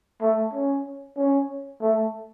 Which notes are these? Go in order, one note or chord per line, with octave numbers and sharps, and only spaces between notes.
A3
C#4
C#4
A3